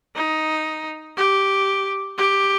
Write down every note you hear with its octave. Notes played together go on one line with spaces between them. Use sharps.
D#4
G4
G4